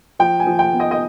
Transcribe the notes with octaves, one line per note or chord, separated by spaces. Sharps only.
F3 G5
G#5
F3
G5
B3
D#5
D#5